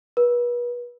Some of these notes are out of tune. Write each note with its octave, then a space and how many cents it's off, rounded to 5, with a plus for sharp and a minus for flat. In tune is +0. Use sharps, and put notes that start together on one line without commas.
B4 -35